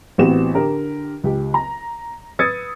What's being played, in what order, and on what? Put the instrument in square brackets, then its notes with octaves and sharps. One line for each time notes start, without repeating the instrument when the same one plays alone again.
[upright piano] A1 B3 C4 F#4 G4 E7
D3 G4 A#4
C#2 G4
A#5
B4 D#6 E6 G#6 A6 C#7